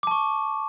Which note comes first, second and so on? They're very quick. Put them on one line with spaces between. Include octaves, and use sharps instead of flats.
D6 A5 C#6